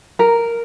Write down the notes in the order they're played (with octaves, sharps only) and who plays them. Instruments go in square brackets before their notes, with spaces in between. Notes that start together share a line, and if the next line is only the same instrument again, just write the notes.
[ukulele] A#4